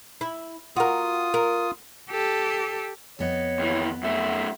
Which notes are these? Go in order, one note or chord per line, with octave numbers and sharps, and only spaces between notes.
E4
F4 F#4 A#4 D#6
A#4
G4 A4
F2 B3 C#5 D#5
D#2 E3
F#2 A3 E5